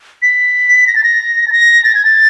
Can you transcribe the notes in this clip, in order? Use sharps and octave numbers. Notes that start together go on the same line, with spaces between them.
B6
A#6
A6
A#6
A6
A#6
A6
G#6
A6